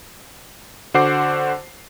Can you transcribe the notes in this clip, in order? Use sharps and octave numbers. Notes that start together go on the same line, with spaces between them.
D3 F#4 C5 F#5 D6 C7